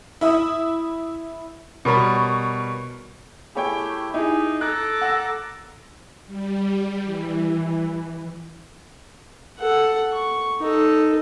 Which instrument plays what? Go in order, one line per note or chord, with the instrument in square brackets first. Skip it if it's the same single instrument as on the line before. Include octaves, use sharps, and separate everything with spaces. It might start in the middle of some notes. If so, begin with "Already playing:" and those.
[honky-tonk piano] E4 E5 D#6
[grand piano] B2 G3 A#4 C#5 B5 C#6
[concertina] A3 E4 G4 [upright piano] G#4 C#5 G5
[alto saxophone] D#4 [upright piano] E4 G#4 [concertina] G4
[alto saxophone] A4 [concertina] A#5 D6 [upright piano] F#6
[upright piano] F#5 E6 A#6
[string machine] G3
E3
[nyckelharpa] A4 F#5
C#6
D#4 A4